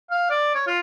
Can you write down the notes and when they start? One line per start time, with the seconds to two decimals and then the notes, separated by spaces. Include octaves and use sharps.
0.11 F5
0.30 D5
0.55 C#5
0.67 F4